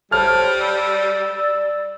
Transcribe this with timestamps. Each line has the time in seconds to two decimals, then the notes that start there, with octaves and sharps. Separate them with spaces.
0.11 G3 A4 C5 C#5 A5 F6
0.59 D5 E6